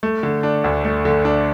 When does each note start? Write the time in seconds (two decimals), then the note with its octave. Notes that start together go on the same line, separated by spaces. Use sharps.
0.03 A3
0.23 D3
0.43 D4
0.64 D2
0.85 A3
1.05 D3
1.25 D4